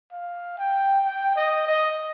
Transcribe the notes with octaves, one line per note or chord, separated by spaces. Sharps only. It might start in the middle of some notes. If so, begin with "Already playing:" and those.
F5
G5
G5
D#5
D#5